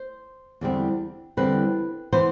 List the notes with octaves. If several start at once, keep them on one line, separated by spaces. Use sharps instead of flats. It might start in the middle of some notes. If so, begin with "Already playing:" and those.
Already playing: C5
E2 D3 G3 C4
E2 D3 G3 C4 B4
E3 B3 C5